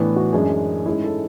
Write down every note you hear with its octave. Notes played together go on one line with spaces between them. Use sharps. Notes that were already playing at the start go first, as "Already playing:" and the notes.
Already playing: A2 E3 B3 D4
F#4
F#2 E3 G#3 D4 G#4
G#2 G#3 C#4 E4 G#4
A4